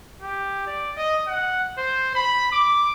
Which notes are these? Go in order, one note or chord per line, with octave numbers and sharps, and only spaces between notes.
G4
D5
D#5
F#5
C5
B5
D6